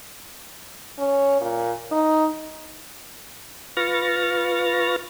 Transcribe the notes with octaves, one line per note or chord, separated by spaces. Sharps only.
C#4
A#2
D#4
F4 B4 C#6 F6 A6 A#6